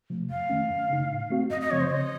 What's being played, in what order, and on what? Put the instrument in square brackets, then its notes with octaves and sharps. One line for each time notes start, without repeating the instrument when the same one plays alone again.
[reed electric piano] C3 F3 A3
[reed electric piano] F2 [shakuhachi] F5
[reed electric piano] D#3 A3 C#4
F#2
C#3 A3 D#4
A2
A3 C4 F#4
[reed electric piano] F#2 [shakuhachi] D#5
[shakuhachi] D#5
[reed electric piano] C#3 F3 C4 [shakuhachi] C#5
[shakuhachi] C5
[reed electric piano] C#3 [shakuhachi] D#5